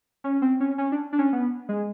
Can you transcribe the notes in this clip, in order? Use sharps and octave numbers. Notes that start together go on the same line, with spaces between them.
C#4
C4
C#4
C#4
D4
D4
C#4
B3
G#3